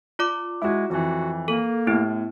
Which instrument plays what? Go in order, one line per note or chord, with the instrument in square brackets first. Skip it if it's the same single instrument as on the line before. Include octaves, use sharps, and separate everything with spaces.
[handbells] F4 D5 D6
[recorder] G#3 [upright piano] E4 F#4
[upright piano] F2 E3 [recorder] F#4
[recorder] A#3 [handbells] A4
[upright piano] A2 [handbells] B3 E4 G4